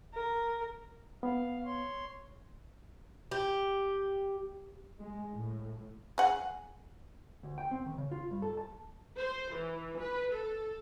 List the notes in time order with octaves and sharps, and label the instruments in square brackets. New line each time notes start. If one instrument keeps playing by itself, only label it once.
[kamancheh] A#4
[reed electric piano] B3 [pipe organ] F5
[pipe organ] C#5 C6
[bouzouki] G4
[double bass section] G#3
A2
[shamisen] G#4 F#5
[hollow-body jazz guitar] D2
G5
C4
D#3
C#3
F4
G2
A4
A5
[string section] C5
E3
B4
A4